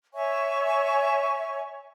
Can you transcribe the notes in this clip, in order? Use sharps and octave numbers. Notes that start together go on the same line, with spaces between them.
C#5 E5 G#5 C#6